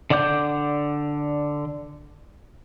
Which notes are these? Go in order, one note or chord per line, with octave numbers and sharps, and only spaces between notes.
D3 D5 F#5 D6 G6